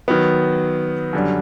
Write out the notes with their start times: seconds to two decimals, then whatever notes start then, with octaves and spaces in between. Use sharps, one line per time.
0.08 D#3 F#3 B3
1.13 F#2 D3 G3